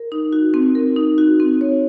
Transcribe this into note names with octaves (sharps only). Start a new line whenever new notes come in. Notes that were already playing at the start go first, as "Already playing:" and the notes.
Already playing: A#4
D#4
F#4
C4
A#4
D#4
F#4
C4
C#5